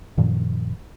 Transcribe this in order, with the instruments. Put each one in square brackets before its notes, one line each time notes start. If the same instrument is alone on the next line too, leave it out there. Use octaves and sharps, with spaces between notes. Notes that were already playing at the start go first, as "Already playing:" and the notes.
[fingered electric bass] F#2 A#2 D#3 F3